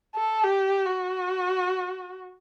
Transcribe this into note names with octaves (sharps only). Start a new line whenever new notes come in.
A4
G4
F#4